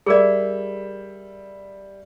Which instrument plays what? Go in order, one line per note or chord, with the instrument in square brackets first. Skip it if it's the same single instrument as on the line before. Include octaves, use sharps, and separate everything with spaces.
[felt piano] G3 E5 [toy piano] G#4 A#4 D5